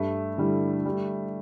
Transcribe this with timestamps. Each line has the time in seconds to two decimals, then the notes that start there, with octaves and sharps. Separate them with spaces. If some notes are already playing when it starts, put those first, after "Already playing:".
Already playing: G2 A3
0.38 D3 G3 E4
0.85 G3